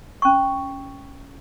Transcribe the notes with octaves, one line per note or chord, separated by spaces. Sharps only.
C#4 C#6